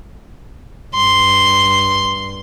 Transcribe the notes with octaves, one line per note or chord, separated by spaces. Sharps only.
G2 C6